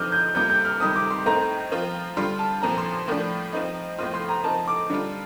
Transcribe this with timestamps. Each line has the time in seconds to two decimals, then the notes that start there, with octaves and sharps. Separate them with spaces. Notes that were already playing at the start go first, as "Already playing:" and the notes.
Already playing: F3 C4 D#4 D6 F6 G6
0.12 G6
0.35 C3 G3 A#3 F4 G6
0.50 G6
0.65 F6
0.80 C3 D#3 G3 D#6
0.96 D6
1.11 C6
1.26 A2 A3 C4 D#4 A#5
1.72 F3 C4 F4
2.17 D3 G3 D4 F4 C6
2.39 A5
2.62 A#2 F3 C4 A#5
2.78 C6
3.08 A2 F3 A3 D4
3.53 F3 C4 D#4
3.99 A2 F3 C4 F4 C6
4.14 C6
4.29 A#5
4.44 F3 C4 D#4 A5
4.68 D6
4.90 D3 G3 D4 F4